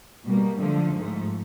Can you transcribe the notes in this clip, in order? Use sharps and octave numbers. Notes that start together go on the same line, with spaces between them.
B2 G3 A#3
D3 F3 A3
G#2 F3 A3